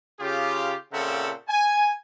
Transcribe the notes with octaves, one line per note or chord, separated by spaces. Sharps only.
C#3 F4 G4
A#2 C#3 C4 A4 E5 F#5
G#5